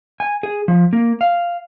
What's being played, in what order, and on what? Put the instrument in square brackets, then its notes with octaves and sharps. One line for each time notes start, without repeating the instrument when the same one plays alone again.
[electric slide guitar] G#5
G#4
F3
A#3
F5